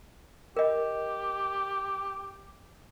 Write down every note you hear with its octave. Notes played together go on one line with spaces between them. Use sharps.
G4 A#4 D#5